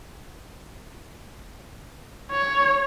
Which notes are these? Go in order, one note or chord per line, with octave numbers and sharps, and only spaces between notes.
C#5